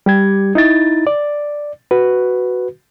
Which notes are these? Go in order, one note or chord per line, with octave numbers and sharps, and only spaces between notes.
G3 G4 G#6
D#4 E4 A6
D5
F#4 B4